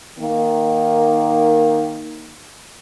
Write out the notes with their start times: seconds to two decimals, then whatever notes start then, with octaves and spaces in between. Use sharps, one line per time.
0.19 D#3 A#3